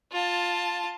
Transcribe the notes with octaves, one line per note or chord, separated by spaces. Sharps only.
F4 A5